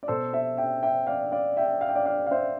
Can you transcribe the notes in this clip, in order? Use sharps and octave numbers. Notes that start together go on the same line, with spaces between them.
D5
B2 A4 C5
C5 E5
E5 G5
E5 G5
D5 F5
D5 F5
E5 G5
F5
G5
D5 F5
D5 F5
F5
C5 E5